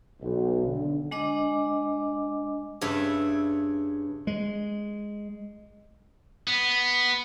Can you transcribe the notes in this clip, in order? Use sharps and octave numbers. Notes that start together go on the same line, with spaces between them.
B1
D3
G#3 D4 D#5 D6
G2 C#3 C#5 E5
G#3
B3